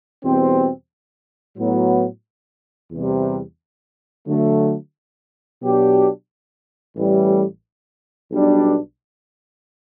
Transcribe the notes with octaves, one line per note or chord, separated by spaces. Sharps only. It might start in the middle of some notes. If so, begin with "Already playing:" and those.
E2 B2 G3 C4
A2 F#3 B3
E2 C3 G3
D3 F#3 A3
B2 F#3 B3 D4 G4
A1 A2 E3 G3
B1 B2 G3 D4